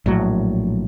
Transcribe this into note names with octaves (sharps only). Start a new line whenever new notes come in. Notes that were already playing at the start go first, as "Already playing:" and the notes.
A#1 A2 F#3